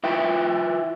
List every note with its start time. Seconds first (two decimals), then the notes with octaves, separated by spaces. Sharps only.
0.04 E4 F4 B4 E5 G5